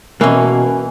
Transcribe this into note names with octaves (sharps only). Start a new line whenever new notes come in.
B2 E3 A#3 C#4